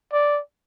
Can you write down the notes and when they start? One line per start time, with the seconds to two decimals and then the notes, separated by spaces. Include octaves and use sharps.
0.13 D5